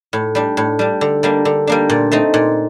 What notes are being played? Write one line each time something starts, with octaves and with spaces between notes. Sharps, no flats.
A2
G3 D4
A2
G3 D4
D3
G3 A#3 D4
D3
G3 A#3 D4
A#2
A3 C4 D#4
A#2